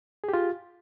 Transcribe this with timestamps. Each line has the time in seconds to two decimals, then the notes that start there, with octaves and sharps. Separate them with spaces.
0.24 G#4
0.29 G4
0.33 F4